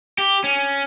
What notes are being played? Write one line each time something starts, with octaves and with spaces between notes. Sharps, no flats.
G4
C#4